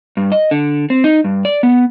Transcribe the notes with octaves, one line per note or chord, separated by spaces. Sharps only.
G2
D#5
D3
C4
D#4
G2
D5
B3